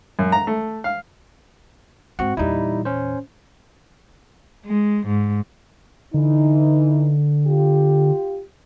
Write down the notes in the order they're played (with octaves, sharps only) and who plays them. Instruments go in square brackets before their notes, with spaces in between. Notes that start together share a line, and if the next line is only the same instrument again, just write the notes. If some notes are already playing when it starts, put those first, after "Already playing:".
[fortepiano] F#2
A#5
A3
F5
[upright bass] G#2 [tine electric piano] C4 F#4 F#5
[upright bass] E2 A#2 [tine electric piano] G3 D#4 E4
[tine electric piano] C#4 C5
[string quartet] G#3
G#2
[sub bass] D3 [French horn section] E3 D#4
[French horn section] F4 G4